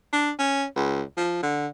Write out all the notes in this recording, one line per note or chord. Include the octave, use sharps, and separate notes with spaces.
D4
C#4
C#2
F3
D3